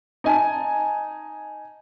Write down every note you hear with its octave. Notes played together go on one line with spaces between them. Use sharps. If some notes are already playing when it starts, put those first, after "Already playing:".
D#4 G#5 A5